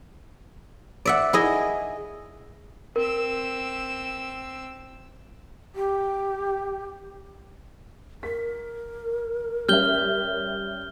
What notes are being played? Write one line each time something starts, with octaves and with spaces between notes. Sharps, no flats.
D5 E5 F#5
E4 G#4 D#5
C4 A#4 E6
G4
A#4 B6
G3 C#4 E5 F6 G6 G7